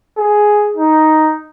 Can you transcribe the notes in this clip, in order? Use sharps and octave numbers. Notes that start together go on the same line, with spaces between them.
G#4
D#4